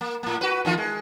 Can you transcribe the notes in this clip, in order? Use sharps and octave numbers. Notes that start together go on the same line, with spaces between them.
A#3
A2 A#3
F#4 B4
E2 D#3 F4
G#3